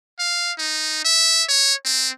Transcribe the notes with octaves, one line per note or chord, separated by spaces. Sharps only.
F5
D#4
E5
C#5
C4